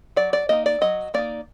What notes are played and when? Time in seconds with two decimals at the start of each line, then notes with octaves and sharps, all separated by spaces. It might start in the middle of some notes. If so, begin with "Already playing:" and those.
0.16 F#3 D5
0.33 D5
0.49 A#3 D#4 D#5
0.66 D5
0.81 F#3 D#5
1.14 A#3 D#4 D5